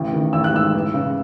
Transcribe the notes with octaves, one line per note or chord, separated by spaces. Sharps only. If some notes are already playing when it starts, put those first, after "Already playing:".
Already playing: A1 C#3
D#3
A1 E6
F#6
G#2 E6
E3
C#3